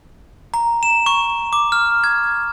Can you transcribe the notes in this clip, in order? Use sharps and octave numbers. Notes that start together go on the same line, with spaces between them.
A#5
E7
C#6
D6
F6
G#6